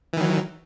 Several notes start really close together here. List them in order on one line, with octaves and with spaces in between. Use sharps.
E3 D#3 F#3